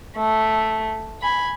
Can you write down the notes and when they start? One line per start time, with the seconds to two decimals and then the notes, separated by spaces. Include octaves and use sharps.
0.17 A3
1.21 G#5 B5